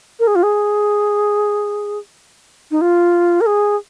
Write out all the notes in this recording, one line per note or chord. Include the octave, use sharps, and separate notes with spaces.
A#4
G#4
F4
G#4
D#4
F4
A#4
G#4